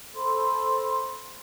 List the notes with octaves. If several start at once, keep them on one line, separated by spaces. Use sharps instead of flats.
A4 C5 B5 C6